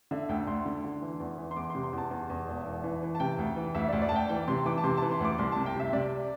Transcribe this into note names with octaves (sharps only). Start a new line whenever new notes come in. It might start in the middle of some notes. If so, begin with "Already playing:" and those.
D3 E5
D2 G5
D2 C6
D3
D3
E3
E2
E3
C6
E2 D6
C6
C3
C6
E2 A5
E2
E2
E1
E2
E3
E3
A5
C3 G5
D2
E3
D2 E5
D5
D2
D5
A5
D2 G5
E3 G5
C3 C6
E3 D6
A5
C3 C6
E3 A5
C6
D2 D6
C2 C6
C3 A5
G5
C3 E5
C3 D5